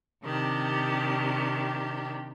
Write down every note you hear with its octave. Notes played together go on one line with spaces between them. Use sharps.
C3 D#3 D4 G4